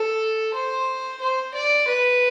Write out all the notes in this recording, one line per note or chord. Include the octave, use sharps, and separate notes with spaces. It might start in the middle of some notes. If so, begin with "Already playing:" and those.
Already playing: A4
C5
C5
D5
B4